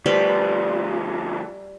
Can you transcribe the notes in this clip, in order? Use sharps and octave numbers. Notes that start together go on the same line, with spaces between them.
D2 F3 G3 B4 C5